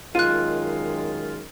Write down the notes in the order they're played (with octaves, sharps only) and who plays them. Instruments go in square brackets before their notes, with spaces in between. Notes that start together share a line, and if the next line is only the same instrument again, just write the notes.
[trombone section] F#2 D#3 G#3 [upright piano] F4 [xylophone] F#6 D#7